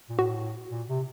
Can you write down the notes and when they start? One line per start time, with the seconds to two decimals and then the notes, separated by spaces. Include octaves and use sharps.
0.09 A#2
0.18 A2 F#4
0.71 A#2
0.88 C3